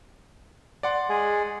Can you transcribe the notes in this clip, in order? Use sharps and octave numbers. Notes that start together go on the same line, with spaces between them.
D5 F#5 C6
G#3 G#4